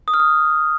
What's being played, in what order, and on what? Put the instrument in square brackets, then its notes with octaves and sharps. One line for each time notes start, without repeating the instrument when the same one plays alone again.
[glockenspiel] D#6
F6
D#6